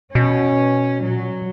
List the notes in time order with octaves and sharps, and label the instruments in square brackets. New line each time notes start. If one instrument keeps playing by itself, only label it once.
[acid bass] B2 [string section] C#4
[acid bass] A#2 [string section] F#3
[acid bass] B2